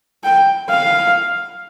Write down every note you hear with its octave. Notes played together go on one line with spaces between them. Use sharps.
G5
F5